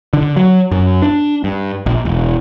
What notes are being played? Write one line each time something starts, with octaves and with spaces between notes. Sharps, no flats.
D3
F#3
F#2
D4
G2
A#1
E1